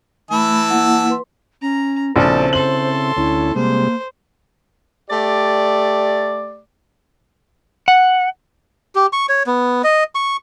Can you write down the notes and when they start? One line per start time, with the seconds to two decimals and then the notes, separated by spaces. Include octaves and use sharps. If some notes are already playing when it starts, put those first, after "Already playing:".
0.31 E3 A3 E5 A5 B5
0.70 A#3 E4 F#5
1.10 B4 C6
1.62 C#4 A#5
2.16 A#1 C#3 C4 E4 A4 C5
2.53 A4 C6 F#7
3.17 D2 C#4 E4
3.56 C3 G3 G#3 A#3 C5
5.10 A3 G4 D5
7.88 F#5
8.95 G4
9.13 C#6
9.29 C#5
9.47 B3
9.84 D#5
10.15 C#6